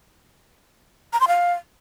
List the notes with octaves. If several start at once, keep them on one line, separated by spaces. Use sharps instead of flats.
A#5
C6
F5